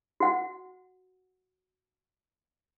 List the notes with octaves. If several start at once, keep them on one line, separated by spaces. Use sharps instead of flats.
F#4 F#5